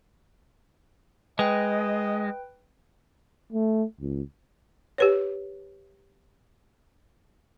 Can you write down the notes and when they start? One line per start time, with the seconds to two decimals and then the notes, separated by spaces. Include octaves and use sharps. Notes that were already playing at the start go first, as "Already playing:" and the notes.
1.39 G#3 B4 D#5 G5
3.53 A3
4.01 C#2
4.98 G4 B4 C#5